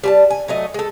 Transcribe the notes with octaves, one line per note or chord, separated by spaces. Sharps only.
G3 G#5 A5
G#5
F#3 A3 D#5
G#3 A4